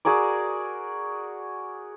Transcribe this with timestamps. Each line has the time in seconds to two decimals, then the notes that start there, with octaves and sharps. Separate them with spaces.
0.05 F#4 G#4 A#4 D5